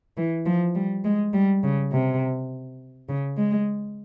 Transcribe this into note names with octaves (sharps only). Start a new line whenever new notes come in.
E3
F3
G3
G#3
G3
C#3
C3
C#3
G#3